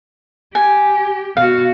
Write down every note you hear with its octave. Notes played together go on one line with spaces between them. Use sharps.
G4 G#5
B2 F#4 F5